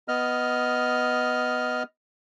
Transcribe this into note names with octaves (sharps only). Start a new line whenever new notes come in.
B3 D#5 F6